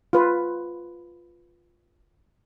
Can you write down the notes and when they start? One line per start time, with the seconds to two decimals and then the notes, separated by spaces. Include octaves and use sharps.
0.13 F4 B4